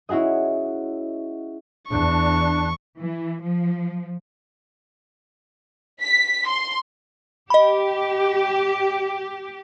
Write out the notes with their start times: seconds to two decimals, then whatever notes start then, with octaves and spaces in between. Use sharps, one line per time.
0.09 C#4 E4 F#4 G#4 D#5
1.90 E2 D4 C#6
2.98 E3
3.41 F3
6.00 B6
6.47 C6
7.50 G4 D#5 B5